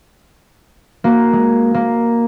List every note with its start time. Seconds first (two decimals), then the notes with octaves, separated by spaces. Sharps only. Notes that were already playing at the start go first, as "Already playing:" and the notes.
1.04 A#3 F#4
1.33 G#3
1.74 A#3